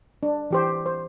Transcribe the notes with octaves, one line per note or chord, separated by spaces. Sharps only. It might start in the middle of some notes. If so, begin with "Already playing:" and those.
D4
E3 G4 C5
C5